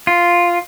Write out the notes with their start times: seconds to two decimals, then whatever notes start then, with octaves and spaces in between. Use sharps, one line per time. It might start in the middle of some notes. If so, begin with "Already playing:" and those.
0.07 F4